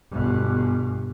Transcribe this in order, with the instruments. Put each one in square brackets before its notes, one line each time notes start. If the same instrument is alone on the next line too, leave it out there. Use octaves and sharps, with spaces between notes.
[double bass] G1 B2